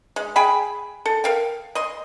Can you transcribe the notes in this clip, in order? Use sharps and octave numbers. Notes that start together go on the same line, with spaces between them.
G#3
G#4 G5 G#5 B5
A4
A#4 F5 G5
D#5 C6